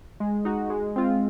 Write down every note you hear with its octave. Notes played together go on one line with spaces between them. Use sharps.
G#3
D#4 F#4
G#3
C4 F4